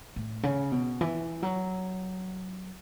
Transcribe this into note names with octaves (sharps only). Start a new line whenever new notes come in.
A2
C#3
B2
E3
F#3